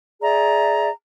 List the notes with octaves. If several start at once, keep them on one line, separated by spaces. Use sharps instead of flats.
G#4 D5 E5 A#5